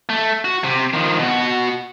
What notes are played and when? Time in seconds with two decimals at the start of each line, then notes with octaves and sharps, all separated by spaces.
0.09 A3
0.45 F#4
0.64 C3
0.94 D#3 F3
1.19 B2 F#4